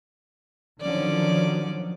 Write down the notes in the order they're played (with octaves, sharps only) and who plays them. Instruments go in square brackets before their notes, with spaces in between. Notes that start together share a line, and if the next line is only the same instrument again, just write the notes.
[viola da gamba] D3 C#4 D5 [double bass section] D#3 F3 F#3